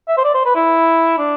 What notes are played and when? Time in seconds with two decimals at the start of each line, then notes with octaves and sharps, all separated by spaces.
0.08 E5
0.17 C5
0.24 D5
0.34 C5
0.45 B4
0.55 E4
1.18 D4